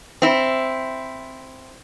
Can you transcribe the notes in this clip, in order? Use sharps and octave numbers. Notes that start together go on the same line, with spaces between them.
C4 E4